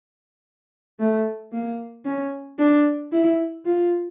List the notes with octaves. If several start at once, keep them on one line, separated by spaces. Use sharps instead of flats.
A3
A#3
C#4
D4
E4
F4